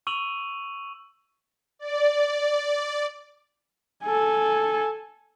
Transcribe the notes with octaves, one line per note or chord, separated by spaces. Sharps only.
C#6 E6 D#7 F7 F#7
D5
A4 G#5